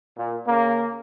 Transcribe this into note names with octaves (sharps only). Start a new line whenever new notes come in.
A#2
C#3 A#3